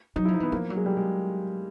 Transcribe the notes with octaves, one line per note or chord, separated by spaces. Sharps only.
F#3 D#4
E4
F3
D#4
E3 B3
F3 A#3
F#3
G#3
G3
G#3